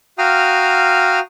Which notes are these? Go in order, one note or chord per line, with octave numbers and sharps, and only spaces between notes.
F#4 F5 G5 A#5 D#6 F6